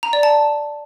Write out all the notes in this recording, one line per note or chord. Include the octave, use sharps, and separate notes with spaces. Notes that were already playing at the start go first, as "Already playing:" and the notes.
A#5
D5
A5